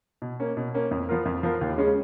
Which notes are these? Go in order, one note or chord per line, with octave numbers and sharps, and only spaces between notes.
B2
A#3 C#4
B2
A#3 C#4
F2
F3 B3 F4 A#4
F2
F3 B3 F4 A#4
D#2
C#3 G#3 C#4